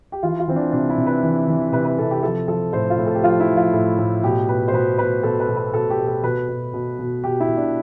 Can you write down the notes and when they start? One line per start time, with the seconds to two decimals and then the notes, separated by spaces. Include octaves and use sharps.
0.12 G4
0.23 E3 F4
0.40 F4
0.48 E3 C4
0.56 D4
0.72 C3 D4
0.89 E4
0.98 C3
1.06 B4
1.23 E3
1.48 E3
1.72 C3 B4
1.85 B4
1.98 C3 A4
2.11 G4
2.23 F3 A4
2.48 F3 A4
2.73 A2 C5
2.90 F4
2.98 A2
3.07 A4
3.15 G4
3.23 F3 F4
3.40 E4
3.48 F3
3.56 F4
3.73 A2
3.98 A2
4.23 B2 G4
4.48 B2 B4
4.68 C5
4.73 B2 B4
4.98 B2 B4
5.23 B2 A4
5.40 B4
5.48 B2
5.57 B4
5.74 B2 A4
5.90 G4
5.99 B2
6.07 A4
6.23 B2 B4
6.48 B2
6.73 B2
6.99 B2
7.24 B2 G4
7.40 E4
7.49 B2
7.57 D4